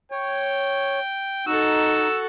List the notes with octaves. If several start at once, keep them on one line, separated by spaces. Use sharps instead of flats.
C#5 G5
D#4 F#4 A4 E6